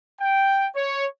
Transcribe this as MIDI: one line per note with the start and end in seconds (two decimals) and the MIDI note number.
0.20 0.68 79
0.76 1.06 73